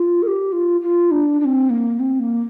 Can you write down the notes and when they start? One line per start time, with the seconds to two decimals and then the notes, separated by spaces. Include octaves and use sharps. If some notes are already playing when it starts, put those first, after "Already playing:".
Already playing: F4
0.22 A#4
0.27 G4
0.52 F4
0.81 F4
1.11 D4
1.40 D4
1.45 C4
1.70 A#3
1.99 C4
2.19 A#3